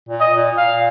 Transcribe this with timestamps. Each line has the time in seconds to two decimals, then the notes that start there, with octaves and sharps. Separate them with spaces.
0.09 A#2
0.21 D#5
0.33 A#2
0.57 A#2 F5